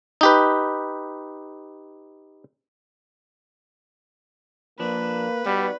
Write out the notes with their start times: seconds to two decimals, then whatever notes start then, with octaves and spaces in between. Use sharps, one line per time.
0.21 D#4 G4 B4
4.79 F3 A#3 D4 B4
5.46 G3 B3 D#4 F#4 D5